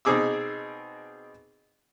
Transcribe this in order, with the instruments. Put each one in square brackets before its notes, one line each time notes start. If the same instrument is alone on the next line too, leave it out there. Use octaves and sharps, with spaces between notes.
[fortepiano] B2 C4 D#4 G#4 D6 E6